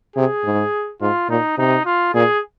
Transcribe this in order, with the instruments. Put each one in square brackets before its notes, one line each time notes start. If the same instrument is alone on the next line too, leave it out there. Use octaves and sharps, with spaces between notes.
[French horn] C3 [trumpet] G#4
[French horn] G#2
[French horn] G#2 [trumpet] F4
[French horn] A#2 [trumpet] D#4
[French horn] C3 [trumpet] D#4
[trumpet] F4
[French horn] A#2 [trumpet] G#4